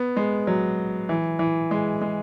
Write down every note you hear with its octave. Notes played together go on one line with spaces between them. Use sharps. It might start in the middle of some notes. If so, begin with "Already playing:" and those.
Already playing: B3
G#3
F#3
E3
E3
G#3
G#3